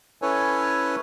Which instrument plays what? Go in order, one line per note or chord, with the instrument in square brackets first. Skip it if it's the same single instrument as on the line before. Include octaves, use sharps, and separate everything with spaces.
[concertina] C#4 E4 A4 B4 C#5 G#5